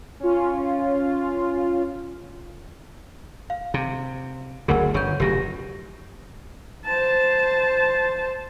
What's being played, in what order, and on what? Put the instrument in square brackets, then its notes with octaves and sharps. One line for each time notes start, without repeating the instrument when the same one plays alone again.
[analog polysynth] C#4 F4
[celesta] F5
[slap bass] C3
[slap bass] F#1 D2 C#3 [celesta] G#4 A#4 F#5
[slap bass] G1 C#3 [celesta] C#5 C#6 G6
[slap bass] F1 C#3 F#3 [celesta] G4 A#6
[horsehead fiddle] C5 A5